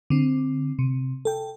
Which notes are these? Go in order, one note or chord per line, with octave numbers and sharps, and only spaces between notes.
D3 C4
C3
A4 G5